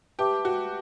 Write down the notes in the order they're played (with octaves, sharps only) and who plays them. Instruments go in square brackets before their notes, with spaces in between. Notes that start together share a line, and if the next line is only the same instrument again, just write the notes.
[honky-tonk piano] G4 [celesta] B4 E5 A5 D6
[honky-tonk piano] F#4